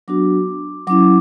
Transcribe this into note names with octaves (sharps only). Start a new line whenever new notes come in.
F#3 B3 D4 F#4 D6
F#3 C#4 E4 D6